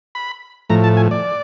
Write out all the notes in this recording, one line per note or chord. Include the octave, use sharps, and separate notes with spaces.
B5
A2 F3 A3 A#5
A5
G#5
D5